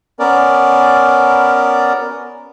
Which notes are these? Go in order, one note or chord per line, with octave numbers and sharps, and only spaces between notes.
B3 C#4 A#4 D5